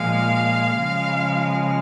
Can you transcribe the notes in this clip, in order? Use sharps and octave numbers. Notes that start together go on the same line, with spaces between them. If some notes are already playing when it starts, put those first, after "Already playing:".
Already playing: A#2 F3 G#3 F5
C#3 F3 G#3